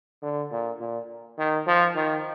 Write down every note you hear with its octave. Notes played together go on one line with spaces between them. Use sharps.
D3
A#2
A#2
D#3
F3
D#3